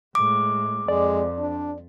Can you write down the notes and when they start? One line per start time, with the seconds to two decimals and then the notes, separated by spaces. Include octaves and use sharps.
0.15 A2 G#3 D6
0.88 F2 G#3 D5
1.38 D4